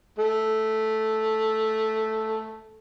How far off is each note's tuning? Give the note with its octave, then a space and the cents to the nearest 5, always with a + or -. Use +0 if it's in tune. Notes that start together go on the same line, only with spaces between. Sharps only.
A3 -5